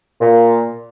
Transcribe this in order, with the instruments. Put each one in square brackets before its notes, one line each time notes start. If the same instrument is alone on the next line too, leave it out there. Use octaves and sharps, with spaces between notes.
[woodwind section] A#2